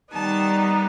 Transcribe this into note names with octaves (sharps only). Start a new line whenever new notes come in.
D#3 G3 B3 D#4 A5